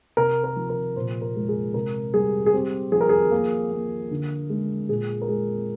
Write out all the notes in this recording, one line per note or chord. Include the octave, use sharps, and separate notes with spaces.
C3 A#4
A#4
F3
A#4
A#2 C5
A#4
G#3
G#4
C3 A#4
G3 G#4
G#4
C4 G4
F3 G#4
A#4
G#4
A#3
A#3
D3
G#3
A#2 G#4
A#4
G#3 G#4